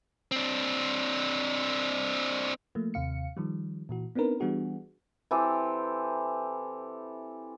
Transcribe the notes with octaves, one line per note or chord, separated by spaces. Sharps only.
C4 D4
F3 A3 A#3
D#2 C3 F5 C#7
D#3 F3 G3
A#2 E3 F#4
B3 C4 D4 D#4 A#4 B4
E3 G3 B3 D4 F#4 G#4
E3 C4 G4 A4